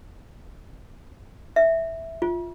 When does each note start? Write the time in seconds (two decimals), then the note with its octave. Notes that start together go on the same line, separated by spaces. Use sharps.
1.56 E5
2.22 F4